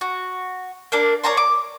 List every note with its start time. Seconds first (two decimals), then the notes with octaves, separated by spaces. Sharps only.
0.01 F#4
0.92 A#3 D4 A#4
1.24 C#5 D5 A#5 C6
1.37 D6